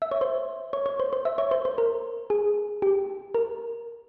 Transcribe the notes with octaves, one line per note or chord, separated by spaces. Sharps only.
E5
C#5
C5
C#5
C#5
C5
C5
E5
C#5
C5
C5
A#4
G#4
G4
A#4